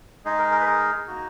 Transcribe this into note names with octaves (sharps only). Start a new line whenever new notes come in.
G#3 D#4 G#4
A#4
A#4
B4
A#4
A#3 D#4 F#4